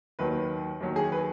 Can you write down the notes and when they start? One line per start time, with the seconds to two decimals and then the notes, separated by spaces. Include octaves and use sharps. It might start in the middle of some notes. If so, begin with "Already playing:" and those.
0.19 D#2 D#3 F#3 B4
0.80 D#2 D#3 F#3
0.96 G#4
1.12 B4